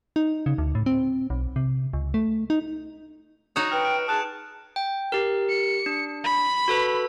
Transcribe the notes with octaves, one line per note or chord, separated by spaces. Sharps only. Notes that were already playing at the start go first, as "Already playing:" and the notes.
D#4
C#3
D2
A2
C4
B1
C3
C#2
A3
D#4
D#4 F#4 C#5 D#6 E7
B4 G5 F6 C#7
F6 D7
G#4 A5 D#6 F#6 E7
G5
G4 A#4
C#7
D4
B5
F#4 A4 B4